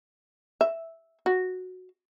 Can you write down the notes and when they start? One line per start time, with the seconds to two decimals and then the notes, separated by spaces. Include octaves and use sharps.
0.61 E5
1.26 F#4